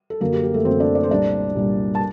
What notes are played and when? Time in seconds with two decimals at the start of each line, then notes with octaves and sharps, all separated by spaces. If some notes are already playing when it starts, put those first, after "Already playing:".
0.10 A4
0.20 F#2 D3 F#3 A#3 A#4
0.33 G4
0.43 G4
0.54 A3 A4
0.65 F#2 D3 F#3 C4 C5
0.80 D4 D5
0.95 D5
1.03 C5
1.10 C2 A#2 G3 D4 D5
1.55 C2 A#2 G3
1.95 A5